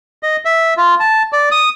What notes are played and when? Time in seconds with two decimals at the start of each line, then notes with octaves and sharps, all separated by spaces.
0.23 D#5
0.45 E5
0.77 F4
1.00 A5
1.33 D5
1.51 D#6